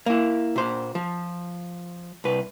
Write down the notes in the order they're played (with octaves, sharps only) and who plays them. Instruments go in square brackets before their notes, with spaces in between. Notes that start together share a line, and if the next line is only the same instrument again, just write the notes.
[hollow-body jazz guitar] A#3 E4
A#2 C5
F3
C2 B4